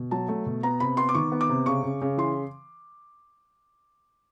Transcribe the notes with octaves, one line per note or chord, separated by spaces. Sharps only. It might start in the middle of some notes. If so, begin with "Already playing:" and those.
Already playing: B2
F#3 A5
A3
B2
B3 A#5
C3 B5
B3 C6
D6
D#3 C#6
B3
D6
C3
C#3 C#6
C#3
C#3
E3 C6